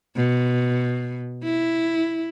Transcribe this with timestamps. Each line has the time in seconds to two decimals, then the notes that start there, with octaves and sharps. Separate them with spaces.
0.16 B2
1.44 E4